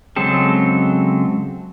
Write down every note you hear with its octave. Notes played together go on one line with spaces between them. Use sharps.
C#3 F#3 G#3 C4 A4